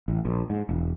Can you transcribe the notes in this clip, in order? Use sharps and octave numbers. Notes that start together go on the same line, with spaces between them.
A1
A#1
G#2
E1